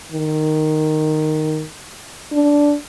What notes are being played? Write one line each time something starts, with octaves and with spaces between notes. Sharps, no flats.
D#3
D4